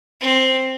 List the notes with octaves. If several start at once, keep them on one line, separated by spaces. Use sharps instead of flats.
C4